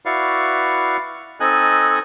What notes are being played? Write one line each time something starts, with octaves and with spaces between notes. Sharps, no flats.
E4 F#4 B4 D5 F5 C#6
C4 D#4 A4 D#5 G#5 F#6